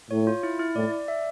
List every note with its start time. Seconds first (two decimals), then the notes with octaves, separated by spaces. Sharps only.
0.10 A2 C#5
0.27 F4
0.43 E4
0.59 E4
0.76 A2 D5
0.92 D5
1.08 E5